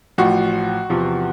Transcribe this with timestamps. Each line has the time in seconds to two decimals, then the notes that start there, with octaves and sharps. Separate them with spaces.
0.18 A1 A2 F3 F#4
0.90 E2 C3 F3